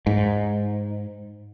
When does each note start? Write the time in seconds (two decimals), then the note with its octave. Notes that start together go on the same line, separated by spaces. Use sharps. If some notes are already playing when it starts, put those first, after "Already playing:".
0.07 G#2